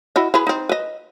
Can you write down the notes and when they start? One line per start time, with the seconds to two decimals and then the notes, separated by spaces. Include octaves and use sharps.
0.16 E4 F#4 D#5
0.34 E4 G#4 B4
0.47 C4 D#4
0.69 B4 D#5